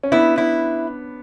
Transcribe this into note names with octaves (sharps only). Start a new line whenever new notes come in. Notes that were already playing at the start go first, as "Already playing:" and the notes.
C#4
B3 D4 E4
E4